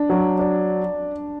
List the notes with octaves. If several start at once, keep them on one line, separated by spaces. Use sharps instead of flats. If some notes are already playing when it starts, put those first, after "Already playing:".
Already playing: D4
F#3
D4